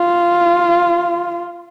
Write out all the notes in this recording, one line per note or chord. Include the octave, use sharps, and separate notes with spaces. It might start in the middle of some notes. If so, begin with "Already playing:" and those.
Already playing: F4